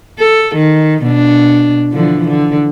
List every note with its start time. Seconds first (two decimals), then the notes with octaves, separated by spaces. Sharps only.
0.19 A4
0.55 D#3
1.04 B2 D4
1.92 D3 E3 F3
2.28 D3